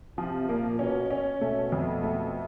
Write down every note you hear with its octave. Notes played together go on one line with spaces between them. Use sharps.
C3 F3
A#2 A#3
B2 C#4
C#4
B2 A3
F2
A3